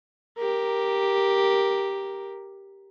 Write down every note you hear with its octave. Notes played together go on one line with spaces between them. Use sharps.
G4 A#4